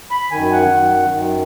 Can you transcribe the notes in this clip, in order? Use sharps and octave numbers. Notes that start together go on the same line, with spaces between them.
B5
F#2 D#3 G#5
F#5
F#2 D#3
F#2 D#3